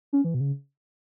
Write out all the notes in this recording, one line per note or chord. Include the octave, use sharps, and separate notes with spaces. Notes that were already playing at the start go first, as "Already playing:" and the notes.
C#4
E3
B2
C#3